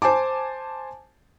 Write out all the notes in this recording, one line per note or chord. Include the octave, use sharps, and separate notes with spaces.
C5 G#5 A5 D6